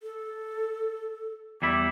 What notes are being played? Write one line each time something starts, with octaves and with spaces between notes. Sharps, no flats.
A4
E2 G3 E4 D6